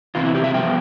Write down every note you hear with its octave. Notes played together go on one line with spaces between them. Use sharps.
E2 C3 E3 F4
E4
G4
E5
G2 F3 B3 G5